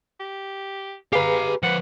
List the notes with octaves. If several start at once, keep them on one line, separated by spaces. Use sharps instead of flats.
G4
G4 G#4 B4 F5 A#5
F3 B4 F#5